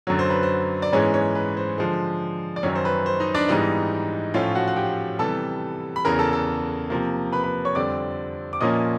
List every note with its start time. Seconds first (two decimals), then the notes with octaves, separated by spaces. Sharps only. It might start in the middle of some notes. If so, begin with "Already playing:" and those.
0.07 F#2 D3 F#3 C#5
0.19 C5
0.30 B4
0.43 C5
0.82 D5
0.93 G#2 E3 G#3 B3 C#4 C#5
1.14 C#4 C#5
1.35 B4
1.57 C5
1.78 D3 F3 G#3 C5
2.56 D5
2.63 F#2 D#3 F#3 C#4 C#5
2.75 C5
2.85 B4
3.06 C5
3.20 D#4 D#5
3.35 D4 D5
3.49 G#2 E3 G3 B3 D#4 D#5
4.34 A2 F3 A3 C#4 F4 F5
4.55 F#4 F#5
4.68 F#5
4.76 G4 G5
5.19 C3 E3 G3 B3 A4 A5
5.96 B5
6.05 E2 C#3 E3 A#4 A#5
6.19 A4 A5
6.33 A4 A5
6.90 C3 F3 A#3
7.32 B4 B5
7.43 B4 B5
7.65 C#5 C#6
7.75 F2 D3 G3 C4 D5 D6
8.53 D6
8.60 A#2 F3 A#3 C#4 D#5 D#6